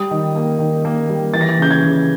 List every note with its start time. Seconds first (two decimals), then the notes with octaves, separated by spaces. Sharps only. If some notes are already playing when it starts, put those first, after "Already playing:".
Already playing: G3 D#6
0.11 D#3
0.36 A#3
0.59 D#3
0.85 A#3
1.09 G3
1.34 E3 A6
1.41 A#6
1.49 A6
1.58 C#3 G6
1.71 G#6
1.83 C#3